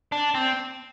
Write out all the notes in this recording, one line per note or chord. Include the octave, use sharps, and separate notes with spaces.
D4
C4